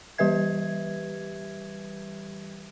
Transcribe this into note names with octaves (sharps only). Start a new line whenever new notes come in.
E3 G3 G4 B4 E5 G#6